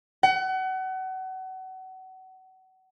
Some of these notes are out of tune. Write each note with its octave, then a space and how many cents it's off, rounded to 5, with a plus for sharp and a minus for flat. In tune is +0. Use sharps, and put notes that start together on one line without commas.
F#5 +30